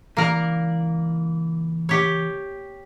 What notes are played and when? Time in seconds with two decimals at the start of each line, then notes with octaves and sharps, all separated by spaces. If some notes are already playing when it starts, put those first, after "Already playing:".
0.17 C#2 E3 A#3 A#4 D5
1.89 G4 C#5